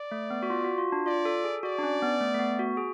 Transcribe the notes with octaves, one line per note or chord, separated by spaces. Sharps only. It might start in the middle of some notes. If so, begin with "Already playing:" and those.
Already playing: D5
A3
B3
F#4
F4
F#4
F4
D4
F4 D5
A4
G#4
F#4 D5
D4
C#4
B3
A3
A3
B3
F#4
G#4